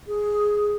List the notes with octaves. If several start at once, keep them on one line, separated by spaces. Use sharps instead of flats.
G#4